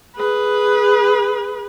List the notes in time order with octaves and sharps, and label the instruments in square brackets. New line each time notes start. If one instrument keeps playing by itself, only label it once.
[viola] G#4 B4